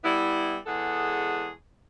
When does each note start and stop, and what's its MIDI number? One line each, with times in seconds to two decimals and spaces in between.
0.04 0.57 55
0.04 0.57 59
0.04 0.57 64
0.66 1.49 40
0.66 1.49 56
0.66 1.49 68
0.66 1.49 69
0.66 1.49 78